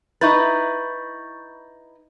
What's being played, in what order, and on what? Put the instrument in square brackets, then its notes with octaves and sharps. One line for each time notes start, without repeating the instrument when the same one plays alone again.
[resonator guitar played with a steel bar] D#4 E4 B4 [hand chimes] C#6 G6 A6